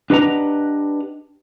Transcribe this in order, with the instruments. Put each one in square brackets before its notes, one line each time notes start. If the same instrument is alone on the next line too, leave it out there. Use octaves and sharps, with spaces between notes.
[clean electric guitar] D4 G4 B4 D#5 F#5 A#5